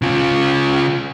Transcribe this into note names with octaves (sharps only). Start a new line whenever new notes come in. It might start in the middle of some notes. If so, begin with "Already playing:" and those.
C#3 F4